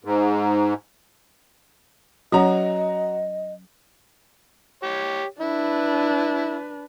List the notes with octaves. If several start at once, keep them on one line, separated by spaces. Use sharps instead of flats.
G#2
F#3 C#4 F#4 C#5 D#5 A#5
G4 C#5
D4 E4 B4